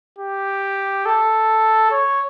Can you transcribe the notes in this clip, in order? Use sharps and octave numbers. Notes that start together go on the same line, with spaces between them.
G4
A4
C#5